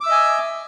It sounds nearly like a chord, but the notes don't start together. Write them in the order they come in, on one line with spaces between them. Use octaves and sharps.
D6 E6 E5 D#5 G#5